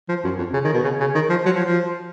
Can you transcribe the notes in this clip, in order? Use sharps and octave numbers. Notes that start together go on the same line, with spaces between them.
F3
F#2
F2
C#3
D#3
B2
C#3
C#3
D#3
F3
F#3
F3
F3